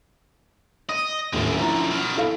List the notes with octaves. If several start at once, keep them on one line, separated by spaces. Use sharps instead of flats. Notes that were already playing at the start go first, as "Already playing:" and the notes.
D#5 D#6
D#1 F#2 A2 D3 E4
F3 E4 A#5
B2 D#3
E4 A4 F5